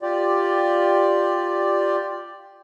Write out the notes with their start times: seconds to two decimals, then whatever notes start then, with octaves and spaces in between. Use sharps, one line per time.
0.02 F4 G4 D5